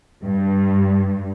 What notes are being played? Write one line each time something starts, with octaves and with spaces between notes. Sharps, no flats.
G2